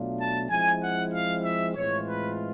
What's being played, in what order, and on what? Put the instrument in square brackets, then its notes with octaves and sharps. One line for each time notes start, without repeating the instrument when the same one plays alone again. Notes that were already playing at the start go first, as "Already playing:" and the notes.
Already playing: [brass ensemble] B2 F#3 A3 D4 F4
A5
F3 G#3 C4 E4 G#5
F#5
F5
E5
A2 E3 G#3 C4 F4 C#5
B4